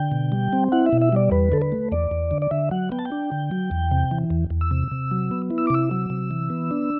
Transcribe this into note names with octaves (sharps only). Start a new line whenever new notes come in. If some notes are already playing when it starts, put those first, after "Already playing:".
Already playing: D3 G5
B2
G3
C4
E4 F#5
E5
B2
E5
G3 D5
E2 B4
D3 A4
B4
A3
E2 D5
E2
D3
D5
D3 E5
F#3 F#5
B3 G5
A5
G5
D4
D3
F#3
E2
C3
E3
E2
E2
E6
C3
C3
F#3
B3
E4
E6
D6
C3 E6
F#3
C3
E3
B3
D4